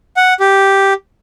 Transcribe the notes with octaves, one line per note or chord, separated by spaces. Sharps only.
F#5
G4